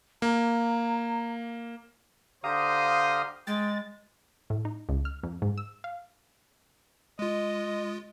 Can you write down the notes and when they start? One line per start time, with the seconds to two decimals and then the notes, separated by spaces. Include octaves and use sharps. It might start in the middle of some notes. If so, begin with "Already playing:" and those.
0.22 A#3 A#5
2.44 D3 G4 C5 F5 A#5 D#6
3.47 G#3 G5 A6
4.50 A2
4.65 D#4
4.89 C#2
5.05 F6
5.23 F2
5.42 G#2
5.58 E6
5.84 F5
7.19 G#3 F4 D#5